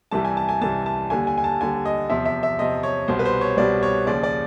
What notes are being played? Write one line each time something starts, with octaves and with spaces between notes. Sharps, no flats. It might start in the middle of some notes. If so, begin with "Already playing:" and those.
C2 C3 E3 G3 A5
G#5
A5
G#5
C2 C3 E3 G3 A5
A5
D#2 D3 G3 G#5
G#5
G#5
A5
D#2 D3 G3 G#5
D#5
E2 C3 F3 E5
E5
E5
E2 C3 F3 D#5
C#5
C2 B2 G3 C5
B4
C5
C#5
C2 B2 G3 D5
C#5
D#2 C#3 F3 D5
D5